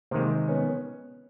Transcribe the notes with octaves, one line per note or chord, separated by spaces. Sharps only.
C3 D#3 G#3 A#3 C4
B3 C#4